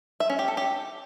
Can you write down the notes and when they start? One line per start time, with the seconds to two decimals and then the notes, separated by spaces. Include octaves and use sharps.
0.20 E5
0.30 C#4
0.39 G4
0.48 A4
0.57 G4